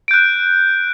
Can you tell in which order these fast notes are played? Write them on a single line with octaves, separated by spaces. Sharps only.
D7 G6 F#6